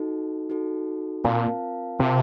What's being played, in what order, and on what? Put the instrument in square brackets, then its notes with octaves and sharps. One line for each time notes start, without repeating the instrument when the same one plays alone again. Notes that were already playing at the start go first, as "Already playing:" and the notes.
Already playing: [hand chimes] D#4 F#4 A4
D#4 F#4 A4
[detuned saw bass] A#2 [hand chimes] C4 F4 A#4 F5 A5
[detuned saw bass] C3 [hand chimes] C4 F4 A#4 F5 A5